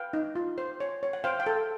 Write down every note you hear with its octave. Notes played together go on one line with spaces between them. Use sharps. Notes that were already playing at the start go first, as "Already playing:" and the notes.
Already playing: B4 F5 G5
D#4
F4
C5
C#5
C#5
F#5
C5 F5 G5
F5 G5
A4